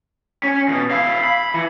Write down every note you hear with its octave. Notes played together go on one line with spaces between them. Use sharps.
C#4 G#5
E2 B2
E4 F5
B5
E3